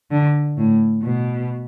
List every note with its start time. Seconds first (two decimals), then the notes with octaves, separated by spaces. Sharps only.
0.11 D3
0.57 A2
1.02 B2